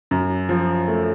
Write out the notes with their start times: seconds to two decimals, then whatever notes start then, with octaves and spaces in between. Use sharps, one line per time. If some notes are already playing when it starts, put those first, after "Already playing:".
0.11 F#2
0.49 F3
0.88 A3